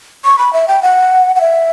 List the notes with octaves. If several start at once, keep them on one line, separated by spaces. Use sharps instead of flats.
C#6
B5
E5
G5
F#5
F#5
E5